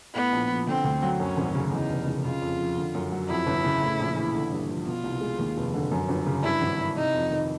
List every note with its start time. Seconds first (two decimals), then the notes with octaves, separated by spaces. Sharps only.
0.15 A2 B3
0.32 A#1
0.50 F3
0.67 D3 C4
0.84 D2
1.03 F#3
1.19 F#2 C#4
1.37 G#1
1.55 C#3
1.72 E2 D#4
1.89 F1
2.07 C#3
2.25 C#3 F4
2.42 F2
2.59 F3
2.77 D3
2.94 F#2
3.12 F#3
3.29 F2 E4
3.47 G1
3.64 C#3
3.82 A2
4.00 A#1
4.16 E3
4.34 D3
4.51 G2
4.69 F3
4.87 B2 F4
5.04 C2
5.21 G#3
5.39 D#2
5.57 F1
5.74 D3
5.91 F#2
6.09 G1
6.26 C#3
6.44 G2 E4
6.61 G#1
6.79 E3
6.96 C3 D#4
7.14 F2
7.31 D#3